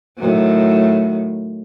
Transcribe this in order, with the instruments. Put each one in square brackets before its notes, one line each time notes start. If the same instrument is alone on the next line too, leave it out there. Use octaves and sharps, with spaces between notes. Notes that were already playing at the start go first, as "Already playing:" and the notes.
[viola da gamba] A2 D#3 F#3